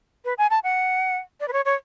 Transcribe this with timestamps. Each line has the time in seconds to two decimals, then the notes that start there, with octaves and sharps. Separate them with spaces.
0.25 B4
0.38 G#5
0.50 A5
0.64 F#5
1.40 D5
1.48 B4
1.53 C#5
1.65 C#5